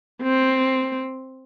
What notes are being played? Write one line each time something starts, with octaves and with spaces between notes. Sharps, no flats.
C4